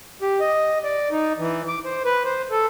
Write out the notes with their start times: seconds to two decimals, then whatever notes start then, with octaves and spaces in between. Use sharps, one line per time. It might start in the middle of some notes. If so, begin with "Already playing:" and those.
0.22 G4
0.40 D#5
0.84 D5
1.11 D#4
1.38 E3
1.68 D6
1.85 C5
2.05 B4
2.25 C5
2.51 A4